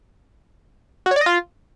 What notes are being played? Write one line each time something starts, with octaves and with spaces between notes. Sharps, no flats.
F#4
C#5
D5
D#5
F4